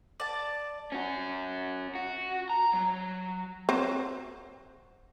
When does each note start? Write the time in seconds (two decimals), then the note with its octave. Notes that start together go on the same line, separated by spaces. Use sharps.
0.20 D5 A5
0.92 C#4 F#4
1.95 F#4
2.50 A#5
2.74 F#3
3.69 F#3 C4 C5